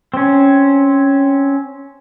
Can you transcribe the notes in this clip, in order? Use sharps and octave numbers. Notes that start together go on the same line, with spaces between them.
C4 C#4